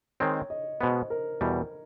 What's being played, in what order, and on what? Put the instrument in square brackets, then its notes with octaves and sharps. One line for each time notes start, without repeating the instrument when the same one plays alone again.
[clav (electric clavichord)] D#3 G#3 C4 [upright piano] C#5
[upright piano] D#5
[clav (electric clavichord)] B2 G#3 B3 [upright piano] C5
[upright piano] A#4
[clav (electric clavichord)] E2 B2 G3